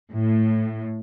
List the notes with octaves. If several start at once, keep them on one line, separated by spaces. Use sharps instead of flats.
A2